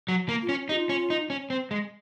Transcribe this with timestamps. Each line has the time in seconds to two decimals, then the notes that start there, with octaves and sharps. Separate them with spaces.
0.08 F#3
0.29 A#3
0.42 F4
0.49 C#4
0.69 D#4 G4
0.74 F4
0.89 C#4
1.10 D#4
1.30 C#4
1.50 C4
1.71 G#3